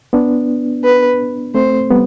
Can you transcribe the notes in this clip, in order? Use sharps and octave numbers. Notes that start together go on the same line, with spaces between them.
B3 D4
B4
A3 C4 C5
G3 B3